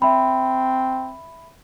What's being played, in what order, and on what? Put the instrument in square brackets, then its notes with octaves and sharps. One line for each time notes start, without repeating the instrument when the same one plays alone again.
[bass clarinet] C4 [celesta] E5 B5